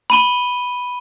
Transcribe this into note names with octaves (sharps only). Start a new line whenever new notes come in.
B5 D#7 G7